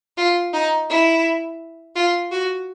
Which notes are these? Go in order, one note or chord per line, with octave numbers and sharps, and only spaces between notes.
F4
D#4
E4
F4
F#4